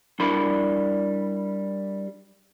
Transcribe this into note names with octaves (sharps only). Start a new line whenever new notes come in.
G3 D4 E4 A#4 B5 C6